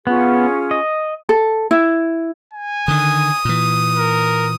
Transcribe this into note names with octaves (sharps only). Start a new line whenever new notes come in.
B3 C#4 F4 G#4
D#5
A4
E4
G#5
D3 D#3 D#6
A#2 E3
A#4